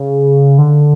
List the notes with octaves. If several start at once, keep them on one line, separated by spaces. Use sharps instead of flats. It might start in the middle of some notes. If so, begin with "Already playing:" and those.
Already playing: C#3
D3